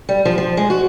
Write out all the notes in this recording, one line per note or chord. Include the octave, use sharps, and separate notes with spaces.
G3
F3
F3
G#3
F#4